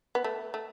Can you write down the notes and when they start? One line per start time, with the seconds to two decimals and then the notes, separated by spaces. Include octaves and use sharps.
0.15 B3
0.24 A3
0.54 A3